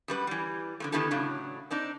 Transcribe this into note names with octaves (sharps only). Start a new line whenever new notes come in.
F#2 G3 B4
E3 G3
D3 F3 A3
D3 D#3 B3 E4 G4 A4
A2 C#3 F#3 D4
C4 D4 D#4